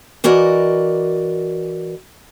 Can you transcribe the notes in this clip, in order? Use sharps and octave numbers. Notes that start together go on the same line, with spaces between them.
E3 F#4 A#4 D5 D#5